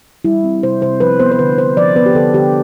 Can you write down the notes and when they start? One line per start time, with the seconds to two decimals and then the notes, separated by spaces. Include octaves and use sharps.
0.25 G3 E4
0.44 C4
0.63 C3 C5
0.82 C3 C5
1.00 F3 B4
1.20 B3 C5
1.32 C5
1.39 D3 B4
1.58 D3 C5
1.77 F3 D5
1.96 B3 B4
2.06 G4
2.15 D3 A4
2.34 D3 G4